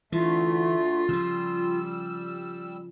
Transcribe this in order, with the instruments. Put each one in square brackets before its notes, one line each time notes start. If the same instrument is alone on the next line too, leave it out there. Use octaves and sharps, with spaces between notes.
[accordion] D2 A3 [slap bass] E3 [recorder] F4
[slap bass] C#3 F3 [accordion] G3 E6